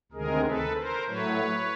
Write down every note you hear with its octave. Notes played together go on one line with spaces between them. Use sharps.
D2 C3 D#3 G#3 G#4 A#4
A4 B4
A#4 C5
A2 F#3 A3 B4 C#5